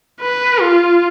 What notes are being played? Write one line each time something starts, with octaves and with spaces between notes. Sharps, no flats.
B4
F4